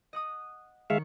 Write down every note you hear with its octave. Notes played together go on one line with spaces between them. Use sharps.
D#5 F#5 D#6
D#3 G#3 C#5 E5 F5 C#7